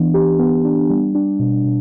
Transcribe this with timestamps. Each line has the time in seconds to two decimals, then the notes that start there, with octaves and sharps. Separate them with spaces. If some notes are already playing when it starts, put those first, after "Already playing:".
Already playing: E3 B3 D4
0.14 G4
0.39 B3
0.65 D4
0.90 G3
1.15 D4
1.39 B2
1.65 B2